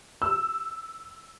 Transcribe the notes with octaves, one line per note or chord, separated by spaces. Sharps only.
E6